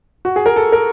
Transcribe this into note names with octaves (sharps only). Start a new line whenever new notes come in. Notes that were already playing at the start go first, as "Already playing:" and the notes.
F#4
G#4
A#4
A4
A#4